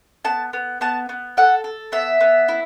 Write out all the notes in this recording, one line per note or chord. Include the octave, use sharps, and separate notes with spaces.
B3 A5
B3
B3 A5
B3
A4 F#5
A4
B3 E5
B3
E4